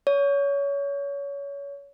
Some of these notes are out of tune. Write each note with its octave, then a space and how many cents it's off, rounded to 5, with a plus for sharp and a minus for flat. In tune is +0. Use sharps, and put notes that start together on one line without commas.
C#5 +25